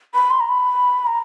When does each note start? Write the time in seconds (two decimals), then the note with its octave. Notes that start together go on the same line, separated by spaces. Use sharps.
0.14 B5
0.30 C6
0.40 A#5
0.48 B5
1.07 A#5